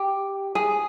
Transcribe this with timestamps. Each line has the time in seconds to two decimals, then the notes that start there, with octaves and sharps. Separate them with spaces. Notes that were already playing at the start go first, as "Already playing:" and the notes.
Already playing: G4
0.55 G#4